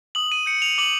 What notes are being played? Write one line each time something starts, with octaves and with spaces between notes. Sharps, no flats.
D#6 F#7
D#7
G6 C#7
F7
D6 F#7